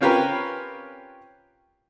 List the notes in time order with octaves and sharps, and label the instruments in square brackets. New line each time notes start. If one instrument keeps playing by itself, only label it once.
[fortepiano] C4 C#4 F4 G4 A#4 B4